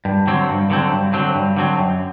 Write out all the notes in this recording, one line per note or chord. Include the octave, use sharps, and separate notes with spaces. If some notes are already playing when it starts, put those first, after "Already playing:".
G2
D3 F#3 C4
G2
D3 F#3 C4
G2
D3 F#3 C4
G2
D3 F#3 C4
F#2